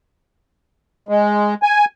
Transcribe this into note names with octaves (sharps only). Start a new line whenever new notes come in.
G#3
G#5